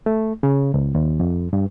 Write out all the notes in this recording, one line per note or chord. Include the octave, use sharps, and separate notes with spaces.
A3
C#3
C#2
D#2
F2
G2